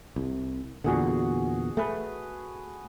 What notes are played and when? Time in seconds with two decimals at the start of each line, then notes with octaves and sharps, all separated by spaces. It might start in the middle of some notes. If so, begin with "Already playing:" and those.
0.16 C2
0.84 E2 A#2 D3 F#4 G#4 F#5
1.77 A3 G#4 B4